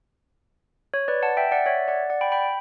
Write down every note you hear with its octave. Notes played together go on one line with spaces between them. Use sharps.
C#5
B4 D5
F#5 A5
E5 G5
D5 F#5
C#5 E5
D5 F#5
D5 F#5
G5 B5
G5 B5